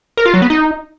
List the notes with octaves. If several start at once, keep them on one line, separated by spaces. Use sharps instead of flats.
A#4
F4
F#3
B3
D#4